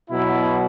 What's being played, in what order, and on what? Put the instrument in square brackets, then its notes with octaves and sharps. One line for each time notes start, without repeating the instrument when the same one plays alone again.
[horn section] B2 F#3 E4